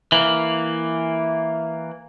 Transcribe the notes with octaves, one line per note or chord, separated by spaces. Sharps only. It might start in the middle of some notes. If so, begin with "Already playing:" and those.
E3 A#3